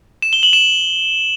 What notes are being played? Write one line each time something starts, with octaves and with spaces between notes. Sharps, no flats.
E7
G7
F#7
E7